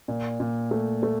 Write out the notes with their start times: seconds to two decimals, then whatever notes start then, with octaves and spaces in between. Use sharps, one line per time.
0.08 A#2
0.40 A#2
0.71 A3
1.03 A3